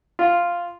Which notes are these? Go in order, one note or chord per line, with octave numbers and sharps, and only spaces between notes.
F4